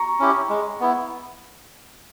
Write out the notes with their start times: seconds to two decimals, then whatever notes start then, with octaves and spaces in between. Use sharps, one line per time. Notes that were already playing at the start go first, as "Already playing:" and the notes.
Already playing: A#5 C#6
0.20 C#4 E4 G4
0.50 G#3
0.80 B3 E4